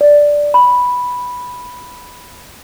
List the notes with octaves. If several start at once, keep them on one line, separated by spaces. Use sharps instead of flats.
D5
B5